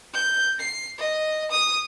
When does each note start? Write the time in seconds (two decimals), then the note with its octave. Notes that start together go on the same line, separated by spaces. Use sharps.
0.14 G6
0.59 C7
0.98 D#5
1.51 D#6